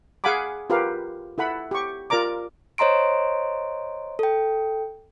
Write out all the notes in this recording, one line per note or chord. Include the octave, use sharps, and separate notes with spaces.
G#4 F5 F#5 G#5 B5 D6
F4 G4 A#4 B4 F5
E4 A4 F#5 B5
G4 C#6
F4 A#4 D5 A#5 D6
C5 C#5 D#5 A#5 C6 D7
A4 G5